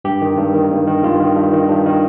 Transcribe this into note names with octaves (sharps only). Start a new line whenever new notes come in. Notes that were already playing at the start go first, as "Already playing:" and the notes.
G2 G4
D#3
G2
D#3
G2
D#3
G2 F4
D#3
G2
D#3
G2
D#3